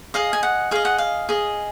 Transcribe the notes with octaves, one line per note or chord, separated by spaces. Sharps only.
G#4 D#5 F5
G#5
F#5
G#4 D#5 F5
F#5
F5
G#4 D#5